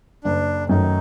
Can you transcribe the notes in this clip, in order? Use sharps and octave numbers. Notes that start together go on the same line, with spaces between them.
F#1 D4
F#2 D#3 F#3 A3 D#4